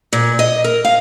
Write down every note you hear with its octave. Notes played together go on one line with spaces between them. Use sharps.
A#2
D#5
A#4
F5